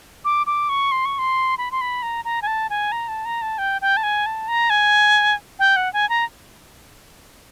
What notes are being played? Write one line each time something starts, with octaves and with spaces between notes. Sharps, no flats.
D6
D6
C#6
C6
C#6
C6
B5
C6
B5
A#5
A#5
G#5
A5
G#5
A#5
A5
A#5
A5
G5
G5
A5
G#5
A5
A#5
G#5
G5
F#5
G#5
A#5